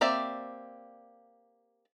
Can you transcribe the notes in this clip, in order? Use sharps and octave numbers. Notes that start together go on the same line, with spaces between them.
A#3 C4 G4 D5 E5